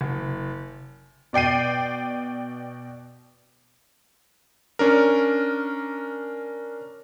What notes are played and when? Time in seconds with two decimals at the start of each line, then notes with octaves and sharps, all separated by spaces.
0.01 F#1
1.33 B2 D5 G5 C7 D#7
4.79 C#4 D4 A#4